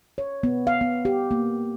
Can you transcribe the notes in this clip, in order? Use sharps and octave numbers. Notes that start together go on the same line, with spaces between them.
C#5
B3
F5
B3
G4
A#3